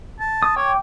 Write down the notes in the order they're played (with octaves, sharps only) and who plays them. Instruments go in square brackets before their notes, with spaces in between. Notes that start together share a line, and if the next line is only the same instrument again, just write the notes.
[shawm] A5
[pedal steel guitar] D#6
[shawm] C#5 [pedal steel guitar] G5 D6